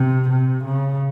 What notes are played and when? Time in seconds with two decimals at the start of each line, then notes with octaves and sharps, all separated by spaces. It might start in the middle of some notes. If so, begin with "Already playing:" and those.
Already playing: C3
0.29 C3
0.65 C#3